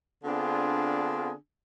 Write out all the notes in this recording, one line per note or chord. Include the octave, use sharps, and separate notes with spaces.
D3 B3 C4 D4 F4 G#4